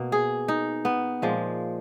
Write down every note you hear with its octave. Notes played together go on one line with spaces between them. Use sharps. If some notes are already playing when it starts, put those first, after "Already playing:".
Already playing: B2 A#3
G#4
D#4
B3
A#2 F3 G#3